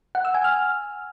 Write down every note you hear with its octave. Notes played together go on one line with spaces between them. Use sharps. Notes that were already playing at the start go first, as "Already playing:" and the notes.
F#5
E6
G#5
F6